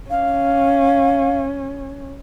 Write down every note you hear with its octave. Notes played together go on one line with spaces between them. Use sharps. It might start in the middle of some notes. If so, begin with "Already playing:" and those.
C#4 F5